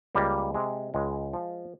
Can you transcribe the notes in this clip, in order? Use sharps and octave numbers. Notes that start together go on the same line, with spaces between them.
C#2 G3 A#3
C3 G#3
C#2 G#3
F3